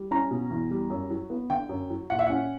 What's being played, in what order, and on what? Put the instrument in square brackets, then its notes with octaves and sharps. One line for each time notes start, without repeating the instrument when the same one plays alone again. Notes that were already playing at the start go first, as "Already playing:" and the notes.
Already playing: [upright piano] G3
C#4 A#5
B2
E2
G3
F#2
F#3
B3
D3 G5
F#2
F#3
A#2 F#5
E5
C#4 F#5